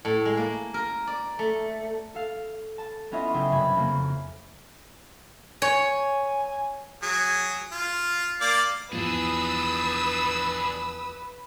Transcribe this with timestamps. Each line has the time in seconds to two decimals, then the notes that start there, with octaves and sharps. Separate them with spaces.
0.05 A2
0.25 G#3
0.37 A#3
0.74 A#4
1.07 D5
1.39 A3
2.15 A4 F5
2.78 A5
3.12 B3 C#4 E4 F4 D#5 E5
3.34 B1 C#3 G#4 E5 G5
3.52 F#1 C3 G3 B5 G#6
3.76 F2 C#3 A#3
5.62 C#5 G#5
7.02 F#3 G#4
7.72 F4
8.41 A#3 D5 D6
8.93 E2 F3 D4 G#4 B4 D#6 E6